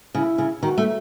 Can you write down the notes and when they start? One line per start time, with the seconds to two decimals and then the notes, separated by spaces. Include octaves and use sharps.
0.15 C#3 E4
0.38 C#3
0.62 D#3 F#4
0.78 A3